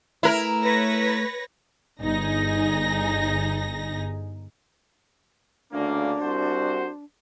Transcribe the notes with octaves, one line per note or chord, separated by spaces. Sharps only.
A3 E4 A#4
B4 C#5 A#6
G1 D#4 G#4 A#6
D2 C#3 A#3 D4
C2 F#4 C5